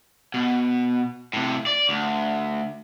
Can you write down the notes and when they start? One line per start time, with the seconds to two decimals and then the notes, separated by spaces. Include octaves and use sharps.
0.34 B2
1.33 A2 C3
1.67 D5
1.89 D2